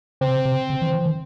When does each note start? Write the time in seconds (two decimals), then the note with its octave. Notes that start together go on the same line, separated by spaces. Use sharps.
0.21 C#3 C4
0.28 C3
0.36 C#3
0.45 C3
0.70 C#3
0.82 E3
0.94 E3
1.06 D#3